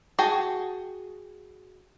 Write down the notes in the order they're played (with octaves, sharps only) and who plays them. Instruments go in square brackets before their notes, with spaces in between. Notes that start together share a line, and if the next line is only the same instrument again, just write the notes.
[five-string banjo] F#4 G#4 G5 A5